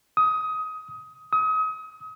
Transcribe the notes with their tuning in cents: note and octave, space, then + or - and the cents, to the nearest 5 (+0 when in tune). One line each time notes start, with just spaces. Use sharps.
D#6 +20
D#6 +35